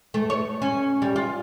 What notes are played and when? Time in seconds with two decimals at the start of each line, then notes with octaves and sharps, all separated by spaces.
0.14 A3
0.30 C#5
0.62 C#4
1.02 G3
1.16 F4